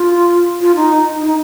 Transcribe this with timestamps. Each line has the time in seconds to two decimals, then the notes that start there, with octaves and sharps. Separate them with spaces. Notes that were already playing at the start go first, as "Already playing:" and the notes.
Already playing: F4
0.61 F4
0.76 D#4
1.22 D#4